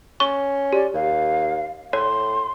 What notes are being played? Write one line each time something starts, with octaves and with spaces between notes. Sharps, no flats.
C#4 C#6
G4 D5
D#2 F5
A2 C#5 C6